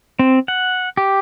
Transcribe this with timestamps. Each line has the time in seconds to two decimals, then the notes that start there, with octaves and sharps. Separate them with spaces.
0.19 C4
0.48 F#5
0.97 G4